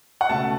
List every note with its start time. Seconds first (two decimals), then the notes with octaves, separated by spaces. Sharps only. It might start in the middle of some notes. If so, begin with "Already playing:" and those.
0.21 F#5
0.29 C#2 B2 A3 A5